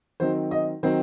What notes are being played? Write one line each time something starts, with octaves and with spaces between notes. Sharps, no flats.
D#3 F#3 C4 D#4 C5
D#5
D#3 F#3 C4 D#4 C5